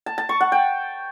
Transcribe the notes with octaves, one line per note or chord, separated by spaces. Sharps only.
A5
A5
C#6
F#5
G5